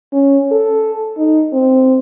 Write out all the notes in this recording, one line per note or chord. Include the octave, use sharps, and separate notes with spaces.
C#4
A4
D#4
C4